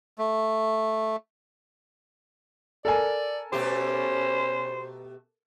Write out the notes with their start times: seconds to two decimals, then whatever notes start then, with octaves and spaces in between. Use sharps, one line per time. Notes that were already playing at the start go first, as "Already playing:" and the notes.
0.19 A3
2.85 A4 A#4 D5 G#5
3.52 B2 A3 C#4 G4 C5